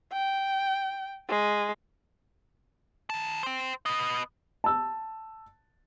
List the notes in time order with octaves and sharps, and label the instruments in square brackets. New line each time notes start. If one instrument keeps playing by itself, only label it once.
[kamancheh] G5
G#3
[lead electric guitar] D#3 A5
C5 G5
B3 D#5
[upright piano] A5 E6